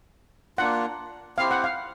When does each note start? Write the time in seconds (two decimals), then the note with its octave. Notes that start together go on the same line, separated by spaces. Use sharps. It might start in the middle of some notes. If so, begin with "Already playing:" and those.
0.58 A#3 D4 F4 F#5
1.37 C4 E4 G4 C5 F5
1.51 F#5
1.64 F5